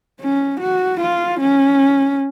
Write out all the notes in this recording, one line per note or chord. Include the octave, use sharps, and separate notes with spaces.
C#4
F#4
F4
C#4